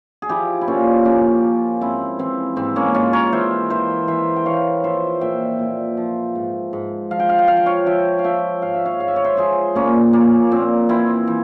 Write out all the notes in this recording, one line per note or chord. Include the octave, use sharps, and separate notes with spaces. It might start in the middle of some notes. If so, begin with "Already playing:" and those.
G#4
F3 E4 G4
E4
A#2 C#4 F4
F3 A#3 C#4
F3
G#2 C4 E4
E3 C4
G#2 C4
A#3 C#4
G#2 C#4 F4
A#4 C#5
E3 C5 E5
E3 C5 E5
E3 C5 E5
G5
E3 C#5 F5
F3 C5 E5
A#2 E5 G5
A#2
F3
G#2
G#2
F3 F5
G5
F5
G5
F3 F5
G5
C#5 F5
F3 E5 G5
F5
F3 E5 G5
G#2 F5
E5
C#5 F5
G#2 F5
E5
C#5
C5 E5
F3 G#4 C5
A#2 A#3 C#4
F3 A#3
A#2 C4
E3 C4 E4
E3